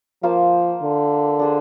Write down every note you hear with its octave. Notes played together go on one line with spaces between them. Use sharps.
F3 A#3 F4 C5 F5
D3
D4 G#4 C5